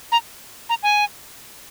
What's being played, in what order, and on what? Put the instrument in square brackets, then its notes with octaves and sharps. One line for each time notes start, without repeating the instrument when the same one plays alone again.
[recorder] A#5
A#5
G#5